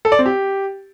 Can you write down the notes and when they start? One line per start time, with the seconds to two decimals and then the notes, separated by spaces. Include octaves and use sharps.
0.05 A4
0.12 D5
0.19 C4
0.26 G4